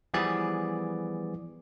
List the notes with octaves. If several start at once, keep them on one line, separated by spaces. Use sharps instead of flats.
E3 F3 G3 B3 G#4 D5